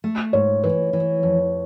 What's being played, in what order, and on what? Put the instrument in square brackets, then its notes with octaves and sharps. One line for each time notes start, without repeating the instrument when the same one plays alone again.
[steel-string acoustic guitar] A3
[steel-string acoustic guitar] G#2 [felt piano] C#5
[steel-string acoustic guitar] E3 [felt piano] B4
[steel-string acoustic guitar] E3
F2